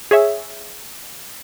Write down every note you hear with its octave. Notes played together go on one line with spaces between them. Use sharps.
G#4 C#5 E5